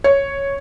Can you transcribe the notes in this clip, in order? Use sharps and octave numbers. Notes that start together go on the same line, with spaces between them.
C#5